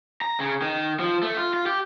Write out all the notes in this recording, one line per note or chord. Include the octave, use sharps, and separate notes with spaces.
A#5
C#3
D#3
F3
A3
F4
F4
G4